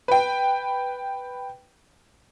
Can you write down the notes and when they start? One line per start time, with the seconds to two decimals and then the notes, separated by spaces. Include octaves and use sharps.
0.08 B4 G5